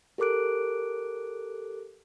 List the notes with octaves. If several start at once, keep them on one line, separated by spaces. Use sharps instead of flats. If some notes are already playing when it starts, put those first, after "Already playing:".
G4 A4 A#4 D6 F#6 D7